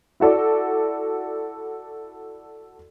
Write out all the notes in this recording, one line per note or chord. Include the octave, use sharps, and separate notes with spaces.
E4 F#4 A4 D5